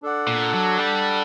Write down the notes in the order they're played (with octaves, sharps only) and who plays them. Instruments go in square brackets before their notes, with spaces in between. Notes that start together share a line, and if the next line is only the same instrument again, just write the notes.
[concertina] D4 A4 D5 F#5
[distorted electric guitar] A#2
F#3
G3